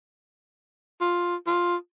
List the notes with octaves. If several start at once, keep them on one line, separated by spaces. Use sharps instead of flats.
F4
F4